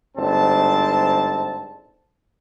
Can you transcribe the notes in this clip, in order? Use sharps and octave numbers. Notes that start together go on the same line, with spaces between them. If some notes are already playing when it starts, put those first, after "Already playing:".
G1 G#2 C4 A5